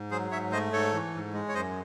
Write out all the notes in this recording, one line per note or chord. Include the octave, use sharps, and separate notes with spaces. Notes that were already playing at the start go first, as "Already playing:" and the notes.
Already playing: G#2
F#3 G#4 C5
G#2 C#5 E5
A3 C5 D#5
G#2 A4 C#5
E3
G#2
G#3
C#5
F#2 C5 D#5